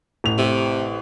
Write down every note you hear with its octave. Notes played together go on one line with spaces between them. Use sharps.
A1 F7
C3